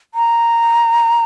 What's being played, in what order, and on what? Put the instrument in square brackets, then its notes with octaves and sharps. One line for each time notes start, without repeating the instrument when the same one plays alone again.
[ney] A#5